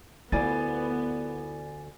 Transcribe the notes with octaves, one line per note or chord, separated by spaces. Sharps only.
D2 B3 E4 F4 D5 G#5 A6